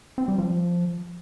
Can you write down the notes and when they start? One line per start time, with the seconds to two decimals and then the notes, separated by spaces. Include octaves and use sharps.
0.18 C4
0.28 G3
0.38 F3